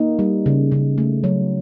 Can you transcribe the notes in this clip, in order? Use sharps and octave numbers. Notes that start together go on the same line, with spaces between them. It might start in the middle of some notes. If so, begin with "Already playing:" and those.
Already playing: A#3 D#4
G3
C#3
C#3
A3
F#3